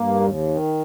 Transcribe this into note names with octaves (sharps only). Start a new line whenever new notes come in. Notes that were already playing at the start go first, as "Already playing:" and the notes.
Already playing: G2 A#3
D#2
D#3